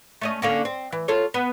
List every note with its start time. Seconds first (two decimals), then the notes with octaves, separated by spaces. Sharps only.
0.21 A3 C#4 D#5
0.42 D3 A#3 C#4
0.65 C4
0.92 E3
1.08 F4 A4 C#5
1.34 B3